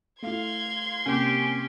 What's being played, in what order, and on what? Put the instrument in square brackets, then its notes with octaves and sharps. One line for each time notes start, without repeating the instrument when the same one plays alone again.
[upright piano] A3 E4 [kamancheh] F5 [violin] C6 G#6
[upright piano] C3 A#3 [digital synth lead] C#4 [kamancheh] G4 G5